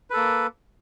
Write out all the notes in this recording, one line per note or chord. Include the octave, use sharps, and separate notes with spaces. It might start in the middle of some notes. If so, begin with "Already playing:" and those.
A#3 A4 B4